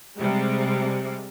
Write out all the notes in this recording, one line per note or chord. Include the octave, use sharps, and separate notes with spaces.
C3 G3 G#3